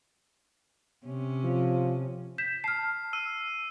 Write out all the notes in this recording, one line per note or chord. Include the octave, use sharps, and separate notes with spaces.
C3 C#4
F3
G6 B6 E7
A5 F6 C7
E6 D#7